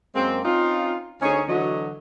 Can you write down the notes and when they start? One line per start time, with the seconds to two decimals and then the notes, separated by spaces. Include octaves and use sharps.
0.15 F#2 G#3 A#3 C4
0.45 C4 C#4 D#4 F4
1.22 D2 C#4 D#4 G#4 C#5
1.49 D3 E3 F#3 A3 F#4 D#5